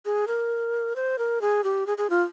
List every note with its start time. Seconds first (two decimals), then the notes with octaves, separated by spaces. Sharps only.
0.05 G#4
0.27 A#4
0.96 C5
1.19 A#4
1.41 G#4
1.64 G4
1.87 G#4
1.98 G#4
2.10 F4